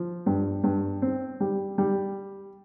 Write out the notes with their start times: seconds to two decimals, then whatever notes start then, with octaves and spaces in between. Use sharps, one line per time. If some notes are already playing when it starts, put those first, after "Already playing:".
Already playing: F3
0.26 G2
0.64 G2
1.02 C4
1.40 G3
1.78 G3